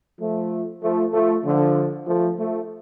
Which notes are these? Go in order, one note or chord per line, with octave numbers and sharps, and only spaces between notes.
F3 A3
F3 A3
F3 A3
D3 F3
F3 A3
F3 A3